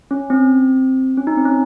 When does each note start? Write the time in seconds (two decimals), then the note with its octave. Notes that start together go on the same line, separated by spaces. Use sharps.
0.11 C#4
0.30 C4
1.17 C#4
1.27 D#4
1.37 C4
1.45 C#4